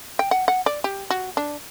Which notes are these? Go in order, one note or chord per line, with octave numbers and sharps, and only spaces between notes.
G5
F#5
F#5
D5
G4
F#4
D4